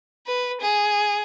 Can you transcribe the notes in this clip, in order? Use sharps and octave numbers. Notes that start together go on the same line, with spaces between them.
B4
G#4